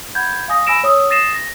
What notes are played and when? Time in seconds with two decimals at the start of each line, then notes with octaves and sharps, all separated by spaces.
0.15 F#5 B5 G6 G#6
0.48 F5 G#5 D#6 A#6
0.67 G#5 B5 E6 A#6 D7 E7
0.84 C#5 D#6 E6
1.10 D#6 A6 A#6 C7 D#7 E7
1.34 A#6